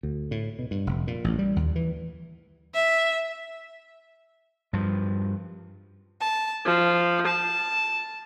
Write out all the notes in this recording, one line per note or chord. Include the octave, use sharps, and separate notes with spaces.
D2
A2
B2
G2
F1
A#2
A1
G3
D#2
E3
E5
G2 F3
A5
F3
A5